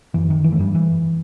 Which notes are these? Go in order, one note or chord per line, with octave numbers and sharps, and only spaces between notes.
F#2 E3
D#3
E3
A3
G2 G3
E3